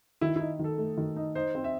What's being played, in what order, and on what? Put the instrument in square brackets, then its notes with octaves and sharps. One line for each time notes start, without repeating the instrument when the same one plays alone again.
[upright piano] D#3 [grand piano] E4
[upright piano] D#4 [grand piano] E4
[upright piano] D#3 [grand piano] A4
[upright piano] A3
D#3
D#4
[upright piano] D#4 [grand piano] C5
[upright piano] C4
[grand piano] E5